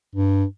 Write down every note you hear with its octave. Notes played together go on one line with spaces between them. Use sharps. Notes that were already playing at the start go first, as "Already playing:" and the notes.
G2